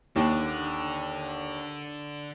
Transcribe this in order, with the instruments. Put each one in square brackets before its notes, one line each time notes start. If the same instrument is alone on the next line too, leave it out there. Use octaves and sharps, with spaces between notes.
[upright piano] D#2 [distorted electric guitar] D3